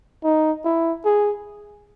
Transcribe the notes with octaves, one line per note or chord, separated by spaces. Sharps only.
D#4
E4
G#4